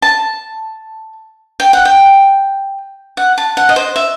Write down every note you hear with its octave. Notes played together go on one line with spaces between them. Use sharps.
A5
G5
F#5
G5
F#5
A5
F#5
D#5
C5
E5